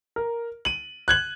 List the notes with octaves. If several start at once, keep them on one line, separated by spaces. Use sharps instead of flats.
A#4
D#7 F#7
F#6 G#6 F#7